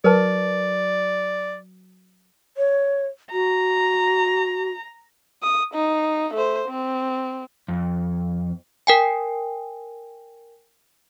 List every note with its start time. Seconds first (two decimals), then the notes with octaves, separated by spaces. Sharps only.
0.04 F#3 A#4 B4 D5 A5
2.57 C#5
3.32 F#4 A#5
5.42 D#6
5.74 D#4
6.34 A3 C5
6.68 C4
7.68 F2
8.87 A#4 G5 G#5